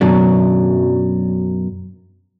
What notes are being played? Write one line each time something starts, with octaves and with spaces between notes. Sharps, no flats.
F#2 B2 F#3 D4